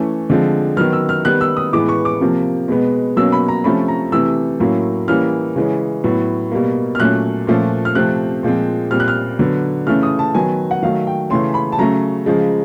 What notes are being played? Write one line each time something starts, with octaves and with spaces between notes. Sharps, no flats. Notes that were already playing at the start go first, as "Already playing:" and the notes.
Already playing: E3 A3 C#4
D3 F3 G#3 C4
D#3 F#3 B3 F6
E6
F6
D#3 G3 B3 F#6
E6
D#6
A2 E3 G#3 B3 D6
C#6
D6
C3 F3 A#3
B2 G#3 B3
B2 F#3 A#3 C#4 E6
B5
A#5
C3 F3 A3 C#4 B5
A#5
C3 E3 A3 E6
A2 F#3 A#3 C#4
E3 G3 A#3 C#4 F6
C#3 E3 G#3 C#4
A2 F#3 B3
B2 G3 A#3
F6
A#2 F#3 A3 C#4 F#6
A#2 F3 A3 C#4
F6
C3 F3 A3 C4 F#6
A#2 F3 G#3 C4
A#2 G3 C4 F6
F#6
F6
D3 F#3 B3
C#3 E3 A3 C#4 F6
D#6
A5
D#3 F#3 B3 G#5
F#5
D#3 F#3 A3 F5
G5
C#3 E3 A3 C#4 C6
B5
A5
C#3 F#3 A3 C#4 A#5
C#3 F3 G#3